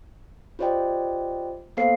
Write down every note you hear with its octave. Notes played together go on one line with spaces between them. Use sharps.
F4 G4 C5 D5 D#5 G5
A#3 B3 A4 C5 F5 C7